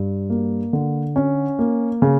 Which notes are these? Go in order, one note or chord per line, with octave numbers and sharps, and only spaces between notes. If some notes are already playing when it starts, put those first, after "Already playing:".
Already playing: G2
A#3
D3
C#4
A#3
C#3